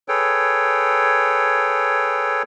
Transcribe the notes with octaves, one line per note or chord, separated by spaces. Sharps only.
G#4 A4 B4 C#5 G5